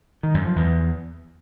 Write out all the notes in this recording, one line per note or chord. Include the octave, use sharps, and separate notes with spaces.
D#3
F#2
F3
E2